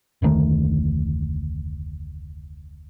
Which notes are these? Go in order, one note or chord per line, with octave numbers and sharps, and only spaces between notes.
F1 D2 D#3 A3